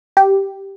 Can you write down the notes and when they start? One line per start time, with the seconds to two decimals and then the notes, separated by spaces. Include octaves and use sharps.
0.17 G4